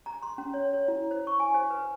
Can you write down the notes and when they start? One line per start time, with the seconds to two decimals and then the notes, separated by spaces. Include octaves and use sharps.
0.06 A#5
0.23 C6
0.38 C#4
0.54 C#5
0.73 C#5
0.88 E4
1.11 C5
1.27 C#6
1.40 G#5
1.54 C5
1.70 B4